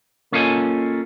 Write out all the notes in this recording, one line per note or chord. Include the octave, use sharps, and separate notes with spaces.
A#3 C#4 F4 A4 D#5 G#5